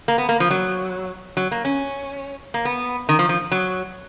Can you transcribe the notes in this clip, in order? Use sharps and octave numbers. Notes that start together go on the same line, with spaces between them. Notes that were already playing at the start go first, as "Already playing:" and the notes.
A#3
B3
A#3
F3
F#3
F#3
A#3
C#4
A#3
B3
D#3
F3
F3
F#3